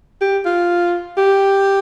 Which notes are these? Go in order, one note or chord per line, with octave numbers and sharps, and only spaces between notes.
G4
F4
G4